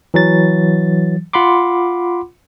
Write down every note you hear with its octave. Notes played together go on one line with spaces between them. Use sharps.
E3 F#3 A6
F4 F#5 B5 C6 D6